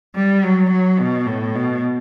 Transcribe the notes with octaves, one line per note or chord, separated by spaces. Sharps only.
G3
F#3
F#3
B2
A2
B2